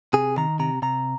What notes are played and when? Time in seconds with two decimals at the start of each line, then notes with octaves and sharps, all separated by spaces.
0.13 C3 G#4
0.37 D#3 A#5
0.59 C3 A#5
0.82 C3 A#5